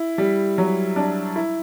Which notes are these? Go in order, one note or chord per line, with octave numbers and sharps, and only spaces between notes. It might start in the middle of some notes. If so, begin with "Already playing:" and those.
Already playing: E4
G3
F#3
D4
E4